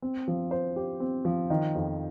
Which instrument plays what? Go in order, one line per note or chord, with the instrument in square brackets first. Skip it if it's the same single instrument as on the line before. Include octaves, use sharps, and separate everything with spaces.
[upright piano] C4
F3
C5
G4
C4
F3
D#3
F2